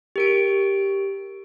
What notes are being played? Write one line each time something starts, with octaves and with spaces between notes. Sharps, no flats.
G4 A#4 D7